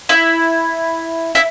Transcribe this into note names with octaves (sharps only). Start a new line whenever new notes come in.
E4
E4